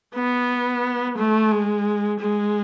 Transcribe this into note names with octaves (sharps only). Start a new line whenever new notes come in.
B3
A3
G#3
G#3